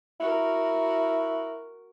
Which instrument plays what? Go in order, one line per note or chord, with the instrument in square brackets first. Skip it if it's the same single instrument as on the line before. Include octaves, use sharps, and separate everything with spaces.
[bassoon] E4 [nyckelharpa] F#4 A#4